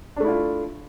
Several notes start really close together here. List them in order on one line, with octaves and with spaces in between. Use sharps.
D4 A3 E4 F4